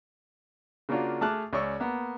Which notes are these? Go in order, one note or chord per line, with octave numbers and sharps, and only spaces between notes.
C#3 A#3 C#4 D4 F4 F#4
A3 G#4 A5 D6 F6 F#6
C#2 C#4 D5 C#6 E6
A#3 B3